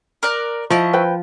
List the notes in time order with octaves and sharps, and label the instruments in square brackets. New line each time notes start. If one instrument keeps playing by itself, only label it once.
[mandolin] A#4 D5 F#6
[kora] F3 [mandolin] E4 D#5 C#6
[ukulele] B4 C5 G5